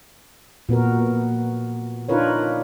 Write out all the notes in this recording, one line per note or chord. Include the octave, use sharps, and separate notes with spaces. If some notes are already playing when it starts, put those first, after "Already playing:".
A#2 B3 F#4 A#4
B3
D4 D#4 F4 A#4 B4 C#5